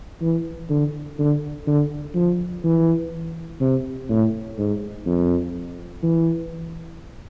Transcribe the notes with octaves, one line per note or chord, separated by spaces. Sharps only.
E3
D3
D3
D3
F3
E3
C3
A2
G#2
F2
E3